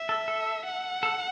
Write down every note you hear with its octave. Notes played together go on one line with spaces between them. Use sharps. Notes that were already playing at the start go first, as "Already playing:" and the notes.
Already playing: E5
A4
A4
F#5
A4